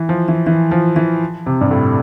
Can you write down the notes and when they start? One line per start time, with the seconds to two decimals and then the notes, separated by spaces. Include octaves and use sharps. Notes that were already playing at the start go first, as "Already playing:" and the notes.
Already playing: E3
0.09 F3
0.28 E3
0.47 E3
0.71 F3
0.96 E3
1.46 C3
1.61 G2
1.71 A2